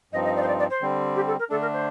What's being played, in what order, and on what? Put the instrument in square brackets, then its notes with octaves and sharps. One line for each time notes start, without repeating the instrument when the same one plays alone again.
[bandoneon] G2 F3 C4 D#4 [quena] D#5
[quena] D#5
D5
C5
D5
D5
C5
[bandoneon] D3 G3 C4
[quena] G4
A4
A#4
[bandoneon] D3 A3 D4 [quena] A4
[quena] A#4
C5